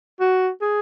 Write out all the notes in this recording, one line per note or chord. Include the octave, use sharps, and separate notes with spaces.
F#4
G#4